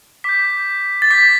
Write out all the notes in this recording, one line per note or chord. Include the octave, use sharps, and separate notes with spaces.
D6 G6 B6
A6
D6 G6 B6